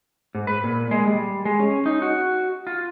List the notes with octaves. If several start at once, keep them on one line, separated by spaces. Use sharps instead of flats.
G#2
B4
A#2
G#3
G3
G#3
C#4
D#4
F#4
F4